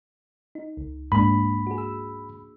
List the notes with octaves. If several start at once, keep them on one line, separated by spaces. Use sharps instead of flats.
D#4
C#2
G#2 A#3 D4 B5
F#4 G#4
E6